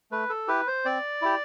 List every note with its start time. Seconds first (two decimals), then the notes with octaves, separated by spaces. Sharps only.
0.11 A3 B4
0.29 A4
0.48 E4 G4 B4
0.67 C5
0.85 C4 D5
1.22 E4 G4